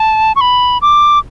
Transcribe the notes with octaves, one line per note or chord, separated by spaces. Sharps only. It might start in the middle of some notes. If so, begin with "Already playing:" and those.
Already playing: A5
C#6
B5
D6